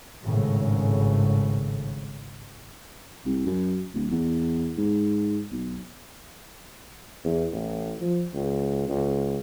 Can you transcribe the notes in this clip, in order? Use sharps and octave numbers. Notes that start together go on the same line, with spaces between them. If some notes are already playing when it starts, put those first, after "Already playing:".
G#1 A2 C#3
C2
F#2
D1
E2
G#2
B1
E2
A1
F3
C#2
C#2